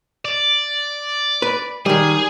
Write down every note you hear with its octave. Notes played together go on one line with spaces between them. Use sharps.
D5
B4
D#3 G3 G#4